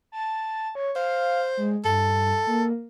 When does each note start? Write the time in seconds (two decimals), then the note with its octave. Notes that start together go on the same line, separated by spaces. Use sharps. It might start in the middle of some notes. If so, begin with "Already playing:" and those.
0.12 A5
0.75 C#5
0.96 C5 F5
1.57 G#3
1.85 G2 A4
2.47 A#3